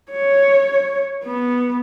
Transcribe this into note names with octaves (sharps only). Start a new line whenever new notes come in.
C#5
B3